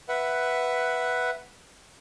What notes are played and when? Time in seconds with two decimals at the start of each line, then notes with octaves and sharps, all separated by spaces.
0.09 B4 E5 F#5